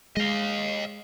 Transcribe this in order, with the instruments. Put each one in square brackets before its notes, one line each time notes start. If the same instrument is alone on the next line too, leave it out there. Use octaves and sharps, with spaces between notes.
[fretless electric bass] G#3 [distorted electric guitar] D#5 F5